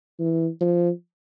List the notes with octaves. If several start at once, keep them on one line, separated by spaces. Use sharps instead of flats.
E3
F3